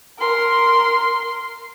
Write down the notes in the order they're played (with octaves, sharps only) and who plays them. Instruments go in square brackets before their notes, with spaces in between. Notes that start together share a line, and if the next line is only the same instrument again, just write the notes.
[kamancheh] A#4 C6